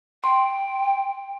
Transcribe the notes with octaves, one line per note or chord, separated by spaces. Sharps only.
G5 C6